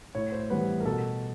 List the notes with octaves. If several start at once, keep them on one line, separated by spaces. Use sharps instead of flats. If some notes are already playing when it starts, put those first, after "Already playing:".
A2 C#5
C5
E3 G3 B3 B4
A#4
B2 A4